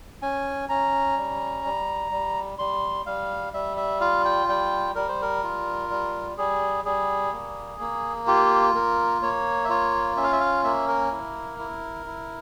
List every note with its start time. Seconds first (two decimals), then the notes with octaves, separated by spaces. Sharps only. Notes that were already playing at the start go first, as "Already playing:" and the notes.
0.22 C#4 G#5
0.69 C#4 A#5
1.17 G3
1.65 G3
2.12 G3
2.59 G3 C6
3.06 G3 F5
3.53 G3 E5
3.77 E5
4.01 F4 F5
4.25 G5
4.48 G3 G5
4.95 G3 A#4
5.08 C5
5.22 A#4
5.43 F4
5.90 G3
6.38 G3 G#4
6.85 G3 G#4
7.33 A#3
7.80 A#3
8.27 F4 G4
8.75 A#3 A#4
9.22 A#3 C#5
9.64 E5
9.70 F4 C#5
10.17 C#4 E5
10.24 F5
10.32 E5
10.40 F5
10.64 A#3 E5
10.88 A#4
11.11 E4
11.59 E4
12.06 E4